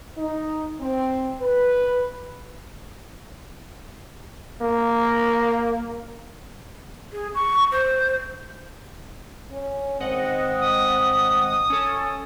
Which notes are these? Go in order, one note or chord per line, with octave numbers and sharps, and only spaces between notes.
D#4
C4
B4
A#3
G#4
C#6
C5
C#4
G#1 C4 D#5 F#5
D#6
C#4 A4